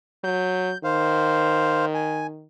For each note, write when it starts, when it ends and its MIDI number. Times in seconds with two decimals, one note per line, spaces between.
0.24 0.73 54
0.24 0.78 91
0.84 2.47 51
0.84 1.86 72
0.84 1.86 77
1.94 2.27 80